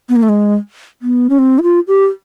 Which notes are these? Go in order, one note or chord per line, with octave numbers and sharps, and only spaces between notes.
B3
A#3
A3
G#3
B3
C#4
C4
E4
F4
G4